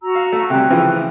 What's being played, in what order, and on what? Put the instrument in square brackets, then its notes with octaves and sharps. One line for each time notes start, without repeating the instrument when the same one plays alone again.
[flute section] F#4 A#5 E6
[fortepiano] F5
A3
[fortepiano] C3 G3 [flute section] C#4 G5 F#6
[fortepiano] C#3 E3 F3